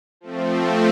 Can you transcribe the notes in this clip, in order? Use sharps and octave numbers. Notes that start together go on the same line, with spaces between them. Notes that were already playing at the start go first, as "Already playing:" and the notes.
F3 A3 C4